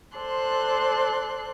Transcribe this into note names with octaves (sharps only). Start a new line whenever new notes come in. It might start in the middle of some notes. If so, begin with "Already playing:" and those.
A4 C5 D5 C6 F#6